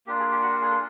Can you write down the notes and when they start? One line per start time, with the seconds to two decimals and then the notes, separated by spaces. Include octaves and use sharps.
0.07 A#3 D4 F4 G4
0.19 G#4
0.31 G4
0.43 F#4
0.52 G4
0.61 G#4
0.70 A4